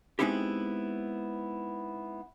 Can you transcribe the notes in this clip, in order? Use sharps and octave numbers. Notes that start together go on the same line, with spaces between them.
G#3 B3 C4 D#4 E4 G4